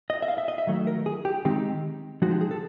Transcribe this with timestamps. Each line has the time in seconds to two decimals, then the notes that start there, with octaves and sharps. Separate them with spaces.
0.10 D#5
0.22 E5
0.28 F5
0.38 E5
0.48 D#5
0.58 E5
0.67 D#3 F#3 A3
0.87 A#4
1.06 G#4
1.25 G4
1.45 D#3 G#3 C4 D#4 G4
2.22 F3 G#3 C4 D#4 F#4
2.31 G4
2.41 G#4
2.51 A4